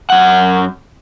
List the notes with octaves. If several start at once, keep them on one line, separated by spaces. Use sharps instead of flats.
F#2 F#5